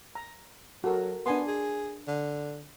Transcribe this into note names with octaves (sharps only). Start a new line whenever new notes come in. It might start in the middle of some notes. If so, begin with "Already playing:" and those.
A#5
F#3 F#4 A4 A#4
B3 D4 G#5 C6
G#4
D3